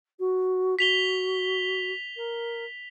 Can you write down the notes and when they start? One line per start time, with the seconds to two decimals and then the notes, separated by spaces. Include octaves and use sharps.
0.19 F#4
0.79 F#4 B6 F7 G7
2.17 A#4